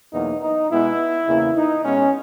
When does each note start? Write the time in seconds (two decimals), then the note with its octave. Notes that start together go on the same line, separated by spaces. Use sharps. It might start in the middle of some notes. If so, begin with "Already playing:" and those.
0.13 E2 B2 F#3 A#3 D#4
0.41 D#4
0.70 B2 G#3 B3 E4
1.27 E2 C#3 E3 A#3
1.56 D#4
1.85 B2 G#3 B3 C#4